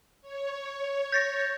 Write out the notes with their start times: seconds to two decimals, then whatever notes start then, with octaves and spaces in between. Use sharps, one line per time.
0.21 C#5
1.12 G6 A6 A#6